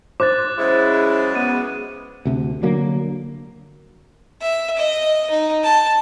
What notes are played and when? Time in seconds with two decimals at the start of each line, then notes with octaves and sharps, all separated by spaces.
0.20 C5 D6 F#6 A6
0.58 C#3 F#3 G#3 E4
1.35 B3 D#7
2.25 D2 C3
2.63 D3 F#3 A#3
4.42 E5
4.77 D#5
5.30 D#4
5.64 A5